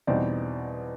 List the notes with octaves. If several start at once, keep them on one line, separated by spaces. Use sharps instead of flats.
E2 B2 G3 C4 D#4 D5